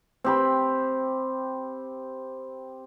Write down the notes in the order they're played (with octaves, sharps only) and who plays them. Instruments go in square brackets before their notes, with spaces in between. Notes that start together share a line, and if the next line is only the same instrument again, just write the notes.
[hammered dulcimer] C4 G4 B5